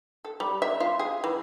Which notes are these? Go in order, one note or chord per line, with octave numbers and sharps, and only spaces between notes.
A4
G3
E5
F4
G#4
E3